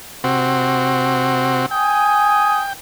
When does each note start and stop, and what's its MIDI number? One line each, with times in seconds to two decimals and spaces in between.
0.24 1.66 48
0.24 1.66 60
0.24 1.66 66
1.71 2.73 79
1.71 2.64 80
1.71 2.64 87